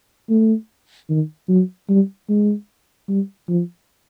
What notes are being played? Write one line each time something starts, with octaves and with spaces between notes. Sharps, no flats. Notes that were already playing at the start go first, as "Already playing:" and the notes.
A3
D#3
F#3
G3
G#3
G3
F3